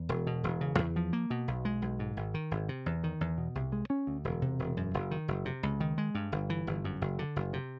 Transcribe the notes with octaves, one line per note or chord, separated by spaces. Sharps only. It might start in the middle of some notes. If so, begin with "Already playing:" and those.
Already playing: E2
E1
B2
E1
C#3
E2
F3
A#3
B2
B1
G#3
B1
G#2
G#1
D#3
G#1
C3
E2
D#3
E2
B2
C2
G#3
C#4
D2
E1
C3
E1
F#2
F#1
D#3
F#1
C3
C#2
D#3
G#3
G2
G1
E3
G1
F#2
F#1
D3
F#1
C3